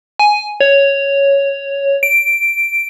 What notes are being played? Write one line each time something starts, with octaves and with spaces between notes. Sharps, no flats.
G#5
C#5
D7